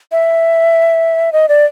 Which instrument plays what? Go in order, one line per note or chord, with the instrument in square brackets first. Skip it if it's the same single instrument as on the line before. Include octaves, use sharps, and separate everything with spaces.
[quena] E5
D#5
D5